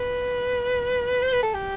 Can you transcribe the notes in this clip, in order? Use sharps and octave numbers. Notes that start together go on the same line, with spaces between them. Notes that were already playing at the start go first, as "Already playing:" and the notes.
Already playing: B4
C5
B4
A4
G4